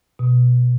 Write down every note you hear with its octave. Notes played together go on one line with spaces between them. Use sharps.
B2